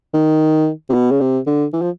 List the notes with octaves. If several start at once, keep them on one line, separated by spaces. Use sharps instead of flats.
D#3
C3
B2
C#3
C3
D3
E3
F3